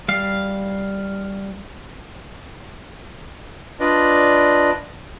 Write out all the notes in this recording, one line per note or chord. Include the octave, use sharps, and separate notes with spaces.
G3 F5
D4 F4 B4 D5 D#5